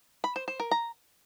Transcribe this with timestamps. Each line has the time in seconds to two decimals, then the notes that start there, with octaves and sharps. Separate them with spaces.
0.24 B5
0.36 C5
0.48 C5
0.60 A#4
0.71 A#5